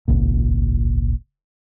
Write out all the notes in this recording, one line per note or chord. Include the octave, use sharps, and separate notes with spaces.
D#1 G#1 C#2 A#2